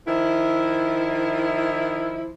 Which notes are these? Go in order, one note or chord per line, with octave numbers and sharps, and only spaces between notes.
D#3 F3 E4